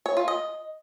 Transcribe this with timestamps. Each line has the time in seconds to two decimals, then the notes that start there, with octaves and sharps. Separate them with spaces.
0.06 C#5
0.17 F4
0.28 D#5